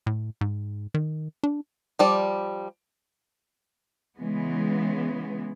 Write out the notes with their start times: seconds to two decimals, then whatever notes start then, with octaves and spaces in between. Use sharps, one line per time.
0.07 A2
0.41 G#2
0.94 D#3
1.44 D4
1.99 F3 G3 D5
4.18 C#3 E3 G#3 B3